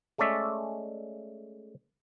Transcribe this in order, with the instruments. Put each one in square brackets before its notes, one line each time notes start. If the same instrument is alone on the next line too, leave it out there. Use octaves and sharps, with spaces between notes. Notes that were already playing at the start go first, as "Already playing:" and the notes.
[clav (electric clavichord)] G#3 A3 C#4 D5 E5